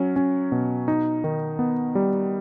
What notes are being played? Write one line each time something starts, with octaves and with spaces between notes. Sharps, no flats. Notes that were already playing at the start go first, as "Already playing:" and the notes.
Already playing: F#3 C#4
C#4
B2
D#4
D#3
B3
G3